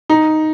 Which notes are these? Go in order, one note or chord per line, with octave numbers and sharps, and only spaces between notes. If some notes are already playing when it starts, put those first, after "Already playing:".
D#4